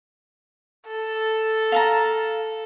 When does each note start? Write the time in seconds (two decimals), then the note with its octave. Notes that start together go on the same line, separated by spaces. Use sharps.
0.87 A4
1.72 F5 A5 A#5